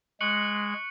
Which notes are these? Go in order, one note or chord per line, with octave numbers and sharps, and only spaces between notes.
G#3 C#6 F#6 C#7 F#7